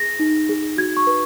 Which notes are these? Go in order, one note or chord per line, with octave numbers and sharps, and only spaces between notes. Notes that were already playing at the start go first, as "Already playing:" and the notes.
Already playing: G#4 A#6
D#4
G#4
F#4 G#6
C#6
B4